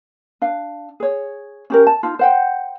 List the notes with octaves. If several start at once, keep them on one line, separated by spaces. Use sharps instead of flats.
D4 F5
G#4 C#5
C#4 G4 A#4
A5
D#4 F4
C5 F#5 G5